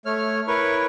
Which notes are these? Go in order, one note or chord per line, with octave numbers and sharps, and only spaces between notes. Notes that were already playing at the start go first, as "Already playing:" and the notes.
A3 C#5 F6
E4 A#4 B4 C#5 C#6